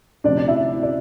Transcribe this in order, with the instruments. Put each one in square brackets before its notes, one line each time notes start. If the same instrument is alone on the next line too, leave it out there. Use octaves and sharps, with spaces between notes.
[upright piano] D2 C3 F3 C4 D4 D5
D5
E4 E5
D5